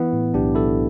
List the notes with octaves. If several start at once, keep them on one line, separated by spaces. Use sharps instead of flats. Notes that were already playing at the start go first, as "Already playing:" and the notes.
Already playing: E3 B3 E4
A2
B1 D4 G4
B1 E4 A4